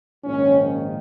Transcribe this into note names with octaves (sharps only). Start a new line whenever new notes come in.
A#1 G#2 D#3 C#4